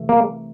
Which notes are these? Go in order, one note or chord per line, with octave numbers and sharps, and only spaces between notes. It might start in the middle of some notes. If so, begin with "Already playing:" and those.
Already playing: C3 E3 A3
A#3